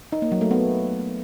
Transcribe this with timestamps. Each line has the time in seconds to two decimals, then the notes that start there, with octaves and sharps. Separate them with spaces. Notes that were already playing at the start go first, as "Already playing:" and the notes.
0.12 D#4
0.22 A#3
0.32 F#3
0.41 A3
0.51 B3